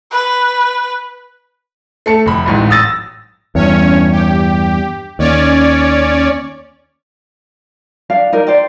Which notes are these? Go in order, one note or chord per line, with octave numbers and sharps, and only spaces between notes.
B4
A3 A4 C#7
F1 B5
D1 A1 G#2
D#6 E6 A6 A#6
E2 G2 C#4 C#5
G4
D#2 C#4 C#5 D5
D4 D5 F5
D#4 A#4 D5
C5 D5 G5